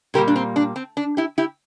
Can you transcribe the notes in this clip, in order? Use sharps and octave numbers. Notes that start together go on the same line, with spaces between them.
A#2 G3 A#3 G4 A#4
D4
C4
D4
C4
D4
E4 G4
E4 G4